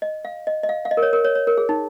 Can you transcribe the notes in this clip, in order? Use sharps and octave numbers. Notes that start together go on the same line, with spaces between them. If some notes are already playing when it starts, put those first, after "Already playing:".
D#5
F5
D#5
D#5
F5
F5
D#5
A#4
C#5
A#4
C#5
C#5
A#4
G#4
D#4